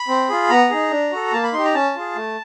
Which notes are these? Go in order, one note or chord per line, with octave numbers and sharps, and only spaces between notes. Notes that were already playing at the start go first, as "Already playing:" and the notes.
Already playing: B5
C4
F4 G#4
B3 A#5
D#4 G#4
D4
F#4 A4
A#3 A5
B5
D#4 G4 C6
A#5
C#4 A5
F4 G#4
A3